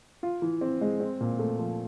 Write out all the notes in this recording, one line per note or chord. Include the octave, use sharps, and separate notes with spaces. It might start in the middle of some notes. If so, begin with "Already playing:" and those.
F4
E3
C4
G#3
C4
A#2
A3
F3